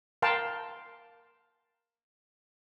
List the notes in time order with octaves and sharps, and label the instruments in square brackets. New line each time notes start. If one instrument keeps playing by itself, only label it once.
[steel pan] A#4 F5 G5 A5 C6